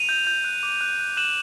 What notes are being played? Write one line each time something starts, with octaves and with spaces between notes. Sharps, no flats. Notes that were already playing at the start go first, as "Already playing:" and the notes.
Already playing: D#7 F7
G6
G6
F#6
D6
F#6
F#6
F#6 E7 F#7